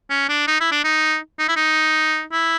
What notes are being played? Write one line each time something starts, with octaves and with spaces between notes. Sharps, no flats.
C#4
D4
D#4
E4
D4
D#4
D#4
E4
D#4
E4